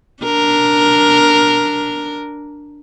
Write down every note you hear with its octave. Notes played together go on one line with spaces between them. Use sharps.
D4 A#4